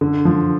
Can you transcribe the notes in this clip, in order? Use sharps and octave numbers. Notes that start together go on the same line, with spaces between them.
D3
F3